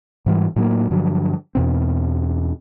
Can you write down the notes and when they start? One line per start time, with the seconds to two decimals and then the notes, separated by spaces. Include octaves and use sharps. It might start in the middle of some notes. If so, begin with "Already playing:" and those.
0.26 G#2 E3 G3
0.56 A2 F#3 A#3
0.91 G2 D3 F3 F#3
1.55 E2 B2 C4